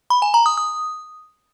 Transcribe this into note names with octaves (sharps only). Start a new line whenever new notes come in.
B5
G#5
A#5
D#6
D#6